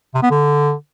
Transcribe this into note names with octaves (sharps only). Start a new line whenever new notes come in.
C3
B3
D3